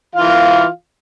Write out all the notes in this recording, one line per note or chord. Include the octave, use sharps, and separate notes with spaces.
E3 F4 F5